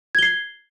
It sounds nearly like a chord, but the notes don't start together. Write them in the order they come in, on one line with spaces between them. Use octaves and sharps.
G#6 G7 C7